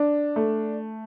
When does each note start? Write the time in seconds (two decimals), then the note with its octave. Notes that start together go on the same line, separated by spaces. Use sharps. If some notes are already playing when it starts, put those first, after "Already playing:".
Already playing: D4
0.36 A3